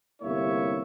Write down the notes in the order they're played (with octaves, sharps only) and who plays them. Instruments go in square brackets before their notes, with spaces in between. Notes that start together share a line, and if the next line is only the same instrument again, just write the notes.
[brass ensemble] G1 C3 A#3 E4 C#5 E5